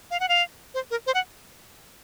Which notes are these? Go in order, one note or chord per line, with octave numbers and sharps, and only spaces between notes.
F5
F#5
F5
C5
A#4
C5
F#5